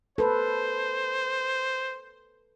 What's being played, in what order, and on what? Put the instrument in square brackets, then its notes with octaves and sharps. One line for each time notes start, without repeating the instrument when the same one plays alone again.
[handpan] A4 B4 [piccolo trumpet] C5